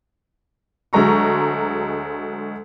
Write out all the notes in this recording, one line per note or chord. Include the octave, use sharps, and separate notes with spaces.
D2 F#3 G#3 A#5 C#6